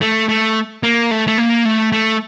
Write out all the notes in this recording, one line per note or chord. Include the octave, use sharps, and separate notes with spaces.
A3
A3
A#3
A3
A3
A#3
A3
A3